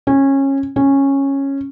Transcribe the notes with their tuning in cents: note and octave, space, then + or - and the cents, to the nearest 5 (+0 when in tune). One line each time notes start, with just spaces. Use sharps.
C#4 -20
C#4 -10